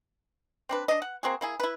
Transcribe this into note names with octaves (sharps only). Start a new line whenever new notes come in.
C4 D4 B4
D4 D#5
F#5
A#3 C4 F#4 G#4
A#3 E4 G#4
E4 B4